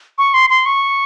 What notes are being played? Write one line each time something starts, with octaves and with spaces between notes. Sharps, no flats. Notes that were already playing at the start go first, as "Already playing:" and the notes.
C#6
C6
C6
C#6